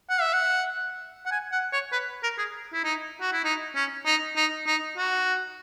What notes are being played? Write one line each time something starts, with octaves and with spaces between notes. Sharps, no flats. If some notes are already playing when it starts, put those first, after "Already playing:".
F#5
E5
F#5
F#5
G#5
F#5
C#5
B4
A#4
G#4
E4
D#4
F#4
E4
D#4
C#4
D#4
D#4
D#4
F#4